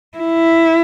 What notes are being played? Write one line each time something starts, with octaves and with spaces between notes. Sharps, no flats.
E4